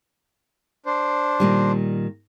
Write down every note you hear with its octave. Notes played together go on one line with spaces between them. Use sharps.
D4 C5
A#2 D#3 G3